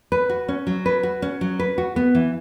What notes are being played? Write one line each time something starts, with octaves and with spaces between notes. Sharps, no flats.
B4
F#4
C#4
F#3
B4
F#4
C#4
F#3
B4
F#4
B3
E3